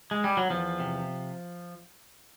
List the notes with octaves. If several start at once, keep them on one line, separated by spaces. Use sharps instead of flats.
G#3
G3
F#3
E2 F3
C3